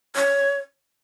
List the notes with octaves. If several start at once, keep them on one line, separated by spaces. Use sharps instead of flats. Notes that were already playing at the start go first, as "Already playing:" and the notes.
C#5